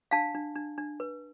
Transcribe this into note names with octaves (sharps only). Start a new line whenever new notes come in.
D4 F5 A5
D4
D4
D4
B4